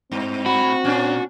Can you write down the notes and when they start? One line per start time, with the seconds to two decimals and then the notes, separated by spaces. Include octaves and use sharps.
0.12 G2 C4
0.46 A2 F#4 B5
0.85 A#2 C#4 D4